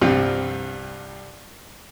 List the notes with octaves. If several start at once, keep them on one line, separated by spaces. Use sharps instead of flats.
C2 G2 F3 C4 F4